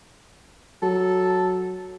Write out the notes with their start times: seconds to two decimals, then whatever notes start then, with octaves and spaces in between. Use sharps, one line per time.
0.83 F#3 A4